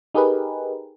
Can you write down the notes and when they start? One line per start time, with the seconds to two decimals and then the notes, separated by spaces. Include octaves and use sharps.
0.14 D#4 G4 G#4 A#4 B4